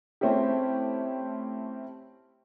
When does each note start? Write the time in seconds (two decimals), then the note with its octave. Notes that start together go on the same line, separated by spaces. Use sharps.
0.21 A3 C4 C#4 E4 G4